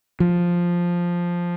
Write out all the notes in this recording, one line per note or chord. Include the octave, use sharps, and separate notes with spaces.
F3